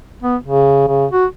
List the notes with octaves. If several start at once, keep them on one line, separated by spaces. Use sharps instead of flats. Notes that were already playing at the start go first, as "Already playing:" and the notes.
B3
C#3
C#3
F#4